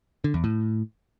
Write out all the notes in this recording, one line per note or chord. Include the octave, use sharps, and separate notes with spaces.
D3
E2
A2